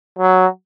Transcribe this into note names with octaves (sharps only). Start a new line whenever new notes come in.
F#3